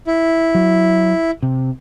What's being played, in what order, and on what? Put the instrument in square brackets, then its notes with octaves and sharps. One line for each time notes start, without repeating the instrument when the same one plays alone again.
[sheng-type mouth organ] E4
[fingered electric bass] F#3
C3